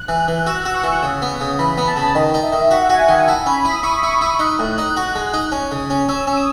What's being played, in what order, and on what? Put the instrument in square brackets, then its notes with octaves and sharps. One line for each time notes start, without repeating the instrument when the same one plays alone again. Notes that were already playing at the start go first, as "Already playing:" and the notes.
Already playing: [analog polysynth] F#6
[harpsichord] E3
E3
[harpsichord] F#4 [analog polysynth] E6
[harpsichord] F#4
[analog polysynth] C#6
[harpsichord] E3
C#3
B3
C#3
[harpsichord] E3 [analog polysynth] B5
[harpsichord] B3 [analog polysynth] B5
[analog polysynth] A5
[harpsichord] C#3
[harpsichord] D#3 [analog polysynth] D#5
[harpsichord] D#4
[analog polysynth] E5
[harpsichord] D#3
[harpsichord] F#4 [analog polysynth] F#5
[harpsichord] F#4 [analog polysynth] G#5
[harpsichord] D#3 [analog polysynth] G#5
[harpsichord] E4 [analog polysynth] A5
[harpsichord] C#4 [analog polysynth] B5
[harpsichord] E4 [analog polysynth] D#6
[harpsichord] E4 [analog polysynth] C#6
[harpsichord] E4 [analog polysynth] B5
[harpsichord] E4 [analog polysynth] C#6
[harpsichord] D#4 [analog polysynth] F#6
[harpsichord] A2 [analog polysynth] F#6
[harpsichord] D#4 [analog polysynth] F#6
[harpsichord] F#4
G#3
D#4
C#4
C#3
C#4
[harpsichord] C#4 [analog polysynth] E6
[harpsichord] C#4
[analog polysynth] D#6